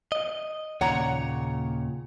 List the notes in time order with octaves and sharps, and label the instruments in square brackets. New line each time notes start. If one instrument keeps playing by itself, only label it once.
[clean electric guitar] D#5
[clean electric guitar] D#2 A#2 C#3 [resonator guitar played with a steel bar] C#5 F#5 A#5